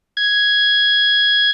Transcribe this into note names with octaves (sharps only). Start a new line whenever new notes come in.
G#6